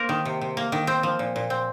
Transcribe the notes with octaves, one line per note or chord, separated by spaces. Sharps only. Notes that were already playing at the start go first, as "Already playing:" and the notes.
Already playing: A#3 A#4 C5
D#3
C3
C3
A#3
D#3
C4
F3
A#2
A#2
C4